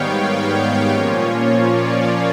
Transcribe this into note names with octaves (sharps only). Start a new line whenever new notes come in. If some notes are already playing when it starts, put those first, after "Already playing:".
Already playing: G#2 D#3 G3 B3 C#5 F5 G5
C#5
A#2 F3 A#3 C#4 F4
C#5
D5